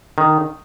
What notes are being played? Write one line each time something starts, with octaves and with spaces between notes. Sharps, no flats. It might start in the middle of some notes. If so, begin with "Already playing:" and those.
D#3